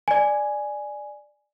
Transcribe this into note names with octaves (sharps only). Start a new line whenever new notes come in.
D5 G#5